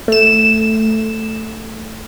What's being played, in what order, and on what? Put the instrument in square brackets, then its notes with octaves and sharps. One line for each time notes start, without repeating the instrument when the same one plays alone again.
[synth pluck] A3 E7